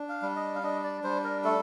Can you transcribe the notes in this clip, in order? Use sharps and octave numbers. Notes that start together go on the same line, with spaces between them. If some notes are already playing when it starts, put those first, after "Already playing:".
Already playing: D4
F5
G3
D#5
F5
D4 D#5
D5
G3 C5
A#4
A3 A4